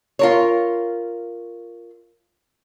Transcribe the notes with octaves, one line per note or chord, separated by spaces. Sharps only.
F4 A#4 C#5